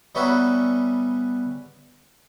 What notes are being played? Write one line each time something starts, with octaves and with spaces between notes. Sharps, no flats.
G3 B3 C#4 D#4 F#4 E5